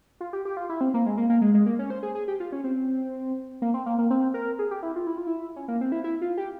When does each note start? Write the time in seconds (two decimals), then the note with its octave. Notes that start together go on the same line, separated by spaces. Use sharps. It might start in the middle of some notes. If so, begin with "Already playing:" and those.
0.21 F4
0.33 G4
0.45 G4
0.57 F4
0.69 E4
0.81 C4
0.94 A#3
1.06 G#3
1.17 A#3
1.29 A#3
1.42 G#3
1.54 G#3
1.66 A#3
1.79 C#4
1.90 C5
2.03 G#4
2.15 G#4
2.28 G4
2.40 F4
2.52 C#4
2.64 C4
3.62 A#3
3.74 C4
3.86 A#3
3.98 A#3
4.11 C4
4.34 A#4
4.59 G#4
4.71 G4
4.83 E4
4.96 F4
5.07 E4
5.18 F4
5.27 E4
5.56 C#4
5.68 A#3
5.81 C4
5.92 E4
6.04 E4
6.22 F4
6.37 G4